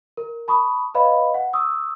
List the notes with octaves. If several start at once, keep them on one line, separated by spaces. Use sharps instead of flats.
A#4
A5 B5 C#6 D#6
B4 C#5 D#5 F5 B5
F#5
C#6 D#6 E6